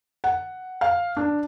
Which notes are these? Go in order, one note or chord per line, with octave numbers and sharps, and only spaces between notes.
F#5
F5
D4